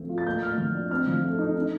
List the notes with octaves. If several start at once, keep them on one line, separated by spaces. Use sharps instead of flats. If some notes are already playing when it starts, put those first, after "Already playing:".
Already playing: F3 A3 C4
F4
A6
A#3 G6
A2 F6
F3
D4
C4 F6
F3
A3
D#4
D#4